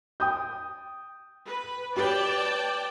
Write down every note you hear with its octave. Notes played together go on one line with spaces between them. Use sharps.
G5 D#6 G6
B4
G4 B4 C#5 D5 G5 A5